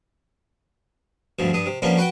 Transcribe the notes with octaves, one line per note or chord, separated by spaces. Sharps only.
D2 G2 B2 F3
G2 D4 D#6
C3
F3 G3 A#3 B3 C#4 D4
F#4 B4 F#5 G5